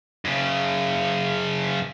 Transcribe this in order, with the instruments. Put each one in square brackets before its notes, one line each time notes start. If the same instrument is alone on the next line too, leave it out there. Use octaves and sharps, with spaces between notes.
[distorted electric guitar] F#2 C#3